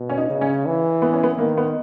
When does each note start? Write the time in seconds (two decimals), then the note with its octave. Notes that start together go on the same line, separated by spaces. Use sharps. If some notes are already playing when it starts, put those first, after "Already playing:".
Already playing: B2
0.09 C#4
0.17 D#4
0.30 C#3
0.41 C#4
0.66 E3
1.02 B3
1.13 C#4
1.23 B3
1.38 D#3 A#3
1.58 B3